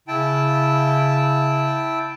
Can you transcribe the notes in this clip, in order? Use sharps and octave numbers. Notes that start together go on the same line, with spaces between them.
C#3 E4 G5 A5